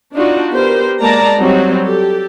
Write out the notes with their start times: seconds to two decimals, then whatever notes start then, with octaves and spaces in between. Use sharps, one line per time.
0.13 D4 D#4 F4 F#4
0.52 B3 G4 A#4 C5
1.00 G#3 A#3 D5 A5 A#5
1.39 F#3 G3 C4 D#4 F#4
1.81 G4 A4